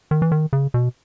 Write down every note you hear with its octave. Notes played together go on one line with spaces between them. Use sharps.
D#3
E3
D#3
C#3
B2